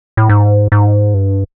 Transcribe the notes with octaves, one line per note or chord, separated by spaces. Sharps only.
A2
G#2
G#2
G2